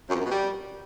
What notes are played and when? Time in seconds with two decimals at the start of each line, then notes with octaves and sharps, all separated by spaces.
0.09 F#2
0.14 F2
0.19 F#2
0.24 B2
0.29 G3